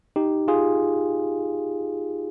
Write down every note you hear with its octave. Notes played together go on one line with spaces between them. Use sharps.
D#4 G4
F4 G#4